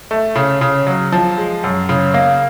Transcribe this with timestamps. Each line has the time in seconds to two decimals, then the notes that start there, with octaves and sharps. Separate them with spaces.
0.11 A3
0.36 C#3
0.61 C#3
0.87 F#3
1.12 F3
1.37 G#3
1.64 F#2
1.89 C#3
2.14 A#3